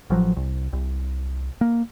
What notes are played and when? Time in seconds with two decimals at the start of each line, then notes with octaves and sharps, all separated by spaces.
0.10 A1 F3 F#3
0.36 C2
0.73 C2
1.61 A#3